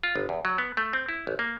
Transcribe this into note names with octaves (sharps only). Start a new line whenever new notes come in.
F4
G1
E2
F#3
B3
A3
C4
E4
A1
A#3